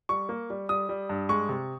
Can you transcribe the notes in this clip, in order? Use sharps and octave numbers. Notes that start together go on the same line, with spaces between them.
G3 C#6
A#3
G3
G3 D#6
G3
G2
G#3 C#6
C3